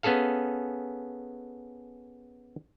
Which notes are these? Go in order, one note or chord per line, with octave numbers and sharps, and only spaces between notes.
B3 C#4 G#4 A4 F5